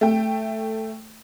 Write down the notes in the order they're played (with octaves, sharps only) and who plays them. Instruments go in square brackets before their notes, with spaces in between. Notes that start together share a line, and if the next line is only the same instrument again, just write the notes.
[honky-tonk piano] A3 G5